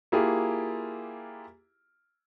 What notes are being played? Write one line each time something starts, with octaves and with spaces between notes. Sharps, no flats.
A#3 E4 F4 G4 G#4